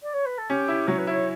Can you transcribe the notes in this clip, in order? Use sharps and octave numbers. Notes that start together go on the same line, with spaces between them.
D5
C#5
B4
A4
C#4 G4
E4
F#3 C#5
B4
E4 C#5